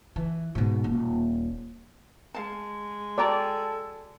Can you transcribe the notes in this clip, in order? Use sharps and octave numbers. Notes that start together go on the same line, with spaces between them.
E3
G#2 B2
D#1
G#3 F5 A5
F#4 A4 D5 G5 A#5